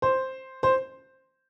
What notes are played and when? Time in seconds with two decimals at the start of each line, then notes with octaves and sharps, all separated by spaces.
0.02 C5
0.63 C5